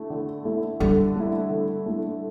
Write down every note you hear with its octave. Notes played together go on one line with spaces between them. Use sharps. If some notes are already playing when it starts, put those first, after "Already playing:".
Already playing: D3 A3 E4
D3
A3 E4
D3 G3
A3 E4
D3
A3 E4